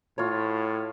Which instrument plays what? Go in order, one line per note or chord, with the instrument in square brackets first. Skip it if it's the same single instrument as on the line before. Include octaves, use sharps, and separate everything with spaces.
[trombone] A2 [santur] F4 C#5